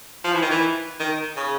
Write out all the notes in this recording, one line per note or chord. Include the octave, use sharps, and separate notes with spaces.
F3
E3
D#3
E3
D#3
C#3